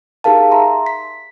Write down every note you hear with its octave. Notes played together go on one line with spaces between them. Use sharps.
D#4 G4 G#4 A#4 F5 A5
E5 A#5 C6
B6